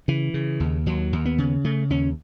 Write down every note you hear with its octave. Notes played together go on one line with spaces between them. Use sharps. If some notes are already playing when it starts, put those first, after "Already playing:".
C#3 E3
C#3
D#2
D#2 F#3
D#2
B3
C#3
C#3 A3
D#2 C#4